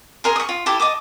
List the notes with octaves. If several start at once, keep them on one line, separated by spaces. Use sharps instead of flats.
G#4 A#4 C6
C#6 D#6
F4
E4 G4 A4
D#5 A5 D6 D#6